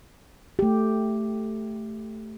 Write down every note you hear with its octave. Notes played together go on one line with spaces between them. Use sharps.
A3 G4